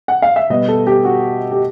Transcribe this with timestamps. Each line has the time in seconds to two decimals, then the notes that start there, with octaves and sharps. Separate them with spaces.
0.08 F#5
0.22 F5
0.36 E5
0.50 B2 G3 B3 D#5
0.68 A4
0.87 G4
1.05 F#4
1.52 G4